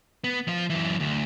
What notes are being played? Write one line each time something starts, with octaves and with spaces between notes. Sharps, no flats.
B3
F3 F4
F#2 E3
D2